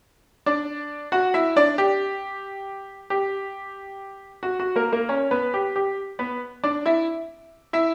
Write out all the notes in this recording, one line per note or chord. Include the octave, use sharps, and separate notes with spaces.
D4 D5
F#4 F#5
E4 E5
D4 D5
G4
G4
F#4
F#4
A#3 A#4
A#3 A#4
C#4 C#5
B3 B4
G4
G4
B3 B4
D4 D5
E4 E5
E4 E5